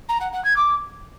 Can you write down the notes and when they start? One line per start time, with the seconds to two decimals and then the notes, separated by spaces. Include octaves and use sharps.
0.09 A#5
0.21 F#5
0.32 F#5
0.44 G#6
0.56 D6